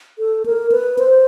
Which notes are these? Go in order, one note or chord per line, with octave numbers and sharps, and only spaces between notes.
A4
A#4
B4
C5